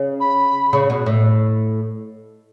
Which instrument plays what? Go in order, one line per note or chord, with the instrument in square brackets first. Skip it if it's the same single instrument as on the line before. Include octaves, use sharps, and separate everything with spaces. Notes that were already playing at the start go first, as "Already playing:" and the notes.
Already playing: [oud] C#3
[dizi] B5
[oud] C#3
B2
A2